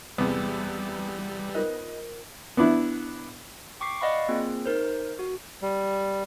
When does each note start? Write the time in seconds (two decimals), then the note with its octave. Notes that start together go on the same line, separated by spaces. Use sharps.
0.18 E2 C3 G3 G#3 B3
1.55 D#4 F4 A#4 C5
2.57 B3 D4 E4
3.80 G5 C#6 D6 B6 C7
4.01 D5 D#5 F5 F#5 B5 C#6
4.29 A#3 C4 F4 G#4
4.66 D#4 A#4 C5
5.19 F#4
5.62 G3